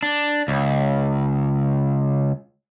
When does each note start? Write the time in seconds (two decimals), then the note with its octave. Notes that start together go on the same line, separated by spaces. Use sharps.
0.03 D4
0.48 C#2